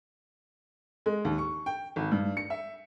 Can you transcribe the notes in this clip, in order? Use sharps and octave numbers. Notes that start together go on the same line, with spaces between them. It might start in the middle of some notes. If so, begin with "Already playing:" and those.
G#3
D#2
C#6
G5
G#1
G2
C#7
E5